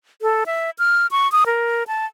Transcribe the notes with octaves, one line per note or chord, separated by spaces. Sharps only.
A4
E5
F6
C#6
D#6
A#4
A5